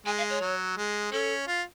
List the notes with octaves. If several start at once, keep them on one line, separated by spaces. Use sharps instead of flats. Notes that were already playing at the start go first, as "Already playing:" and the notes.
G#3 G#5
F5
C#5
F#3
G#3
C#4 A4
F4